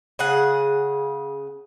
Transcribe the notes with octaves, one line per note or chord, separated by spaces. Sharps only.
C#3 G#4 F#5